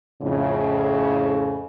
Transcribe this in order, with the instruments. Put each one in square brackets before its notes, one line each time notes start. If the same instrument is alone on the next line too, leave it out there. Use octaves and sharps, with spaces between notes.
[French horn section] F2 A2 C#3